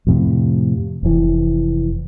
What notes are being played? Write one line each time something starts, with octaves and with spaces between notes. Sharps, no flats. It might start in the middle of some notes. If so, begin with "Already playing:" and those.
F2 A2 C3
F1 E3